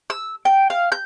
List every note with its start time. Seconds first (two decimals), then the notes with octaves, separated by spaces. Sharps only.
0.10 E6
0.45 G5
0.70 F5
0.92 G6